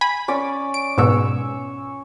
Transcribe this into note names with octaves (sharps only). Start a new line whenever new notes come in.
G#5 B5 B6
C#4 D5
D7
G#2 B2 C#5 E6